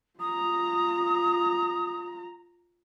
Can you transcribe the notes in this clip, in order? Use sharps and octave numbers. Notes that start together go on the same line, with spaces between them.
F4 A#5 D#6